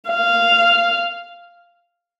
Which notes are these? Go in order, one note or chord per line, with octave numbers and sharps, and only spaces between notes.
F5